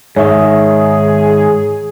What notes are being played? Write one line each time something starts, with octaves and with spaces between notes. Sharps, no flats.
G#2 D#3 G#4 C#5 E5